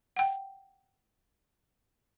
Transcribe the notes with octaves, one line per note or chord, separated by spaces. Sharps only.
F#5 G5